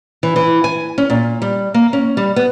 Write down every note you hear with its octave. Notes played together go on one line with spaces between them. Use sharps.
E3
E3
G#5
C#4
A#2
G3
A#3
C#4
G3
B3